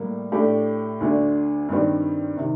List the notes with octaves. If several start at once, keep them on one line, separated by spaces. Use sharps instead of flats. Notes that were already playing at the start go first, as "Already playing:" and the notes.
Already playing: A2 G3 A#3
A2 A3 D4 G4
D2 D3 A3 D4
G2 D#3 G3 C4
C3 D#3